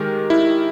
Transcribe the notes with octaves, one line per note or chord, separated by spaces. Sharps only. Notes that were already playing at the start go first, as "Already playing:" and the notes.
Already playing: D#3 G#3 G4 A#4
E4